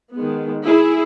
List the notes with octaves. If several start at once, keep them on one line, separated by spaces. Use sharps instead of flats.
D#3 G#3 B3
E4 G#4